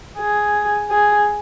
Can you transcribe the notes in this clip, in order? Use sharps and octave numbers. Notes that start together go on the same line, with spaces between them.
G#4
G#4